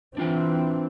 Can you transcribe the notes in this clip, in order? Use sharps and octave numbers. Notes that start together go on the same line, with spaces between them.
E3 C4 D4 F4 G5